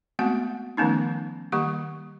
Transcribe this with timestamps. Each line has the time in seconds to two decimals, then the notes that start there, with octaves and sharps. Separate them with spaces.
0.19 G#3 A3 B3 C4 F#4 F#5
0.77 D#3 F3 A3 B3 C#4 D#4
1.52 D#3 G3 A#3 G4 C#6